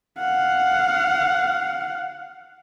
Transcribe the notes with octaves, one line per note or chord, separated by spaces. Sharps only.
F5 F#5